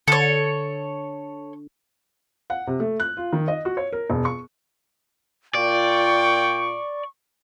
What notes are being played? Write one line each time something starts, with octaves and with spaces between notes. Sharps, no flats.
D3 A4 C#5
F#5
C3
A3
F#6
F4
D#3
D#5
F#4
C#5
A#4
E1
C#6
A#2 F4 D5 G5 C#6